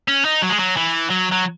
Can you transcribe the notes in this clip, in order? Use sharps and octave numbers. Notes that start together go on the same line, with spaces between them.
C#4
D#4
F#3
G#3
F#3
E3
F#3
F#3